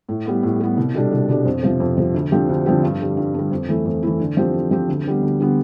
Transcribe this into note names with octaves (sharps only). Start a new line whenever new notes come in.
A2
G3 B3
A2
G3 B3
C2
B2 G3 D4 A4
C2
B2 G3 D4 A4
F2
C3 F3
F2
C3 F3
D2
D3 F3 C4 G4
D2
D3 F3 C4 G4
G2
D3 G3
G2
D3 G3
F2
E3 A3 E4
F2
E3 A3 E4
D3
F3 C4 G4
D3
F3 C4 G4
D2
D3 G3 B3
D2
D3 G3 B3